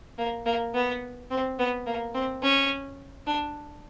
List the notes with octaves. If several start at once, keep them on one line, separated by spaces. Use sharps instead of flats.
A#3
A#3
B3
C4
B3
A#3
C4
C#4
D4